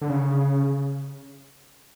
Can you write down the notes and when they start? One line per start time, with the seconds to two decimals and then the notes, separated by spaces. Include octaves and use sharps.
0.01 D3
0.09 C#3